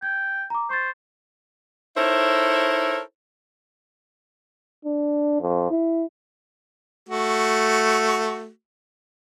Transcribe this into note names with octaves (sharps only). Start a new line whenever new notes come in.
G5 G#6
A#5 D6
C5 C#6 A6
D#4 E4 A4 A#4 C5 C#5
D4
F2
E4
A3 F#4